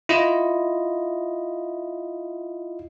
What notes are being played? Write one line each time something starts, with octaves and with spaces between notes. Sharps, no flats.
E4 F4 D#5